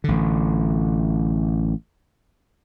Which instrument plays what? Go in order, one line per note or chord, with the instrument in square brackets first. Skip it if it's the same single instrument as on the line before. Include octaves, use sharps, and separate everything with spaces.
[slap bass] A1 D3